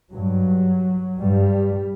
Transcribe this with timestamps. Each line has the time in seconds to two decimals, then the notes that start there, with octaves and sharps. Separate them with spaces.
0.12 G2 F#3
1.21 G2 G3